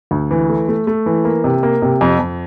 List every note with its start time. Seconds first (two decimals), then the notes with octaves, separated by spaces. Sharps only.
0.11 D2
0.31 E3
0.49 A3
0.69 A3
0.87 A3
1.06 E3
1.25 A#3
1.44 C3
1.63 A#3
1.82 C3
2.01 F2
2.20 F2